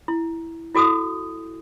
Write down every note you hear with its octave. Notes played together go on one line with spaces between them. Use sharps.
E4
E4 F#4 A4 D#6